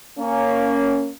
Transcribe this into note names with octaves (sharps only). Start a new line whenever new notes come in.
A#3 C#4